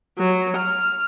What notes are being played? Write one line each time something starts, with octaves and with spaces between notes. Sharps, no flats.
F#3
F6